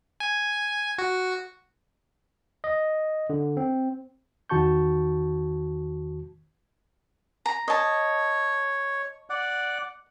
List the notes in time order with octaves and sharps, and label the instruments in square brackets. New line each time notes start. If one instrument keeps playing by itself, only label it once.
[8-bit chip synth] G#5
F#4
[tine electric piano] D#5
D3
C4
[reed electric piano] E2 D#3 F#4 A5 C#6 G6
[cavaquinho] A#5
[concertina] C#5 [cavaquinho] D#5 A5
[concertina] D5 F#5